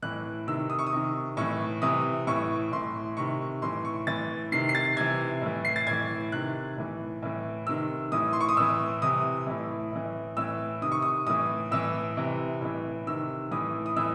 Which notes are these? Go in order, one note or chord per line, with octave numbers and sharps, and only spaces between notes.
A2 E3 F#6
C3 D#3 E6
D#6
C#6
D#6
C3 D#3
A2 E3 C#6
C3 E3 D#6
A2 E3 C#6
A2 E3 C6
C3 D#3 C#6
A2 E3 C6
C#6
A2 E3 A6
C3 D#3 C7
C7
A6
C3 E3 G#6
A2 E3
C7
A6
A2 E3 G#6
C3 D#3 F#6
A2 E3
A2 E3
C3 D#3 E6
A2 E3 D#6
C6
C#6
D#6
A2 E3 E6
C3 E3 D#6
A2 E3
A2 E3
A2 E3 E6
C3 D#3 D#6
C#6
D#6
A2 E3 D#6
A2 E3 E6
C3 E3
A2 E3
C3 D#3 E6
A2 E3 D#6
D#6
A2 E3 E6